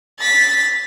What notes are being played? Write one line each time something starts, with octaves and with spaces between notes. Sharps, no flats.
A6 B6